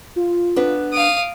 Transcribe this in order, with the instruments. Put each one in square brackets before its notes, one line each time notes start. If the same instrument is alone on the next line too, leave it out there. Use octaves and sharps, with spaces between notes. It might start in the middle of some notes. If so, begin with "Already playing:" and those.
[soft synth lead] F4
[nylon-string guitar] B3 D4 B4
[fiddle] F5 D#6 [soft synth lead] D7